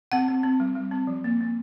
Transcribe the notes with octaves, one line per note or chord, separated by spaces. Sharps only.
C4 F#5
C4
C4
G3
G3
C4
F3
A#3
A#3